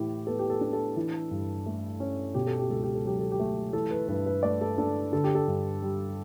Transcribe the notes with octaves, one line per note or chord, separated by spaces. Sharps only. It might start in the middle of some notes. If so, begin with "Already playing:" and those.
Already playing: A2 E3 G4
B3 A4
G4
A4
D4
A4
E3
G2
A3
C#4
B2 G4
A4
G4
C#2 A4
G4
A4
F#3 G4
A4
G4
A3
E3 A4
B4
G2 B4
B4
A3 D5
A4
D4 A4
D3 A4
G4
A4
G2
G3